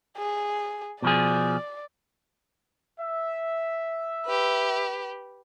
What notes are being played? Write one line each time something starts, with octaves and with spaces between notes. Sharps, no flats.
G#4
B2 F3 G#4 D5
E5
G4 B4